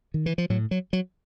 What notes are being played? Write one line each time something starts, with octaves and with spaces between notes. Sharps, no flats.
D#3
E3
F3
A2 F#3
F#3
F#3